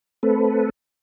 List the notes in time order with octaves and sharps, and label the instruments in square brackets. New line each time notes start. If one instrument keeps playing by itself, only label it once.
[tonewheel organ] A3 C4 A4 B4